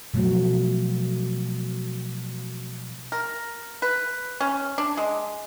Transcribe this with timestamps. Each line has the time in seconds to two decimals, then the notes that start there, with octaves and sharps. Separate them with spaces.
0.14 B2 F3 F#3 A3 F#4
3.12 A#4
3.82 B4
4.41 C#4
4.78 D4
4.97 G#3